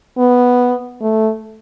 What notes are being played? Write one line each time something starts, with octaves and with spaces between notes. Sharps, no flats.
B3
A3